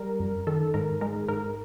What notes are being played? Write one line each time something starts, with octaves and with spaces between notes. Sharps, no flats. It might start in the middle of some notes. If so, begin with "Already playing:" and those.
Already playing: G3 A#4
F#2
D#3 A4
G#2 A#4
G#3 A#4
G#2 A#4